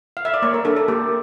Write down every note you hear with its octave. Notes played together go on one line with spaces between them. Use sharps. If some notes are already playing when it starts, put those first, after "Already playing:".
F5
E5
D5
A#3 C#5
A#4
D4 A4
A4
A#3 G4